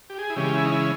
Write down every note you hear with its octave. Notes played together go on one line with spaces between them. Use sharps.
G4
G#4
E4
C#3 E3 G#3 C#4 G4
E4
D#4
E4